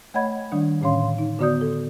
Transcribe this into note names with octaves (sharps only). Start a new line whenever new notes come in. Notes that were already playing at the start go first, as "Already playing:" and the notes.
A3 C#5 D#5 F#5 B5 G#6
D#3 G3 D4
A2 D3 C#4 C#5 F5 C6
D#4
D3 B3 F#4 D5 D#6 G6
A4